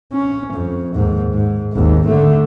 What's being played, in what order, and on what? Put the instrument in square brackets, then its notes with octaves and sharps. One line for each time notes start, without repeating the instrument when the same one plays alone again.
[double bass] C#4
F2
D#2 G#2
G#2
G#1 D#2
D3 A3